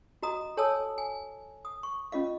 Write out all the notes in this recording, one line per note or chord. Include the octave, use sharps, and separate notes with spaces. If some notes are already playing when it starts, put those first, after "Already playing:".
F#4 D#5 A#5 D#6
A4 C#5 G#5 A5 D#6 E6
G#5
D#6
C#6
C#4 F4 D#5 F5